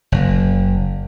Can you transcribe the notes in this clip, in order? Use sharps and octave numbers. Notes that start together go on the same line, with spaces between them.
F#1